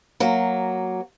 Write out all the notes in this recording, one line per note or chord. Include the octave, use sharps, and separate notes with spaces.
F#3 A#3